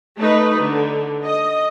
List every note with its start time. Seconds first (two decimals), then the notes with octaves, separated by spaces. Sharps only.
0.18 A3 D#4 B4
0.62 D3
1.26 D#5